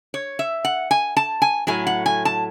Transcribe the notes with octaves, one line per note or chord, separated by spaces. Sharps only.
C#5
E5
F#5
G#5
A5
G#5
A2 F#3 A3 G#5
F#5
G#5
A5